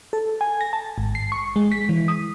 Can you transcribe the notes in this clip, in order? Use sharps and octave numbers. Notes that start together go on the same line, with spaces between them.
A4
G#5
A#6
A5
G#1
C7
C#6
G#3
B6
E3
D#6